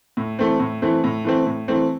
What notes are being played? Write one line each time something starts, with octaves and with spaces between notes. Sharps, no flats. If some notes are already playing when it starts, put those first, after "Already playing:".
A2
E3 A3 C4
A2
E3 A3 C4
A2
E3 A3 C4
A2
E3 A3 C4